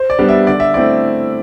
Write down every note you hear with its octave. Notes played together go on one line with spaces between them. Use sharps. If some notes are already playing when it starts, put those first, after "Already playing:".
Already playing: C5
D5
G3 B3 D4
E5
D3 D5
E5
A3 C4 E4 D5